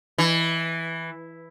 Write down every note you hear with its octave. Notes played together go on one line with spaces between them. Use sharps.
E3